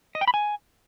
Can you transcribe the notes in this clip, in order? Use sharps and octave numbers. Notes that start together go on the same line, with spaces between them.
D#5
G5
B5
G#5